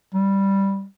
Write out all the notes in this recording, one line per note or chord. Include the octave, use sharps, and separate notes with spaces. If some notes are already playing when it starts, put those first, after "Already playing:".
G3